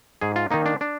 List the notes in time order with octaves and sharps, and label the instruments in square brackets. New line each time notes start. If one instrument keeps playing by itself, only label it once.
[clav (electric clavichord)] G#2 G#4
F4
D#3 A#3 D#4
D4
D4